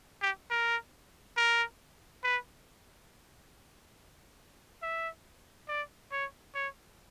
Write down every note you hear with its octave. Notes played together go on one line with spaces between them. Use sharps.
G4
A#4
A#4
B4
E5
D5
C#5
C#5